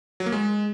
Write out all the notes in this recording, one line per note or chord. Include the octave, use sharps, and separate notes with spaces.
F#3
A#3
G#3